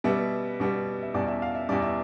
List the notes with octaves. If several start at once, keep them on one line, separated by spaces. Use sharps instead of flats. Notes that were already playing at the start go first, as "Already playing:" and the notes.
B2 G3 B3 E5
B2 G3 B3
E5
E2 B2 G3 D5
E5
F5
E5
E2 B2 G3 D5
E5